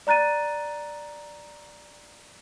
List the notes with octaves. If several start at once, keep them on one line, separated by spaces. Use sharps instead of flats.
D5 A#5 F#6 A6 D#7